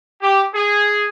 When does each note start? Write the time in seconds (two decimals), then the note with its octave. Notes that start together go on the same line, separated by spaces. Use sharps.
0.22 G4
0.54 G#4